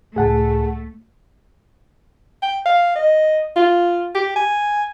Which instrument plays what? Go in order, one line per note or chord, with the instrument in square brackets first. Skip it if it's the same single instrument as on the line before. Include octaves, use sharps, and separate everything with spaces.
[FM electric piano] C#2 A2 [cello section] A3 [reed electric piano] G#4 F#5 A5
[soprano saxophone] G5
F5
D#5
F4
G4
G#5